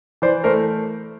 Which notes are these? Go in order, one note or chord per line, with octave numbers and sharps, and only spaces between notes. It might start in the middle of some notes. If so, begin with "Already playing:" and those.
E3 C5 D5
A3 A#4 C5